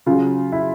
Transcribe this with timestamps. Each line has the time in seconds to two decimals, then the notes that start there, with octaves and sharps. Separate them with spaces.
0.06 C#3 F#3 F4
0.52 E4